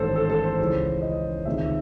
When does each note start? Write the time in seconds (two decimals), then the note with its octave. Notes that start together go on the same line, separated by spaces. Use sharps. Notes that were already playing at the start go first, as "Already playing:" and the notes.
Already playing: A1 G#2 D#3 A4 C5
0.16 A4
0.25 C5
0.30 A4
0.44 C5
0.59 C#2 C#3 E3
1.02 D#5
1.45 C#2 C3 D#3 E5